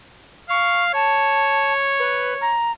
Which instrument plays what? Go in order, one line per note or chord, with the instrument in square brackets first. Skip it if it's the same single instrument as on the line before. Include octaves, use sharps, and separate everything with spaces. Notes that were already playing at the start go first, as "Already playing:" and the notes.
[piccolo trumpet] F5 [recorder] C#6
[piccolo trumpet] C#5 [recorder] A5
[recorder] B4
A#5